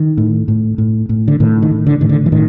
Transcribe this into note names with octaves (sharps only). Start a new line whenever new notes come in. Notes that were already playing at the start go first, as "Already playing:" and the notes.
Already playing: D#3
A2
A2
A2
A2
D3
A2 D#3
D#3
A2
D3
A2 D#3
D3
E3
A2 D#3